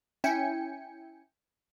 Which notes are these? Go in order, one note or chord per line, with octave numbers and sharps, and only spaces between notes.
C#4 E4 G5 G#5 C#7